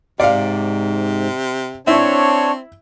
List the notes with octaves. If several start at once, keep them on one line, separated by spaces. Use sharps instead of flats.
G#2 C3 D5 F5
C4 D4 E4 C#5 E5